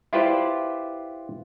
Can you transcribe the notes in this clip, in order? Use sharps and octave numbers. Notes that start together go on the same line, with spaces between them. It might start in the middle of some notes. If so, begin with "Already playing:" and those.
E4 F4 G4 B4 C5 D5